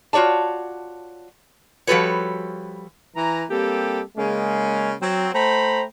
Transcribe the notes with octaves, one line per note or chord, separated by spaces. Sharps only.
F4 F#4 C#5 D5 A5
F3 G3 F#4 A4 B4 C#5
E3 A#5
G3 A#3 C4 G4 A4
C#3 G#3 A#3 C#4
F#3 C4
A3 C5 G5 A#5 B5